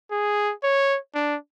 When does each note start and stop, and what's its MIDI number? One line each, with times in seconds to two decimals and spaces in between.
0.11 0.52 68
0.63 0.98 73
1.14 1.36 62